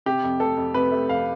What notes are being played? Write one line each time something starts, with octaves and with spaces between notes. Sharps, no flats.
C3 G4
F2
A3 A4
F2
C3 B4
A3
F2 F5